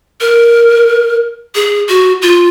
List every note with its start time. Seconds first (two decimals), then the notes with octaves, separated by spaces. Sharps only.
0.21 A#4
1.55 G#4
1.89 F#4
2.22 F4